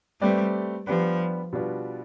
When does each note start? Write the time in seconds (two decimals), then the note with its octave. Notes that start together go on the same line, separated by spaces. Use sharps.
0.21 G3 A3 C4 G4 B4 D5
0.87 F3 G3 B3 D4 G4 B4
1.53 B2 G3 D4 F4 B4